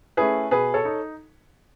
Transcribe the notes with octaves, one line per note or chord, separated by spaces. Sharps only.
A3 C#4 E4 G#4 B4
B2 G#4 B4
A4 C#5
D#4